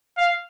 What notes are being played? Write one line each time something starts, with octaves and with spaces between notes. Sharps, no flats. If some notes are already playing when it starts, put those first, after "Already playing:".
F5